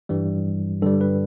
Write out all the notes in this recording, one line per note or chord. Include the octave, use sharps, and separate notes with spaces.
G2 E3 G3
G2 D3 G3 A4
B4